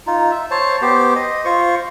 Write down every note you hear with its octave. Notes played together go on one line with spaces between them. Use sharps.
D#4 F4
E5
C5 C#5 A5
B3 G4 C5
D#5
F4 C5 C#6